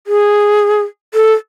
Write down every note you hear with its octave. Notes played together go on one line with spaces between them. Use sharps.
G#4
A4